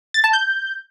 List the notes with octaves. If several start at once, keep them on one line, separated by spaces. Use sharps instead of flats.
A6
A5
G6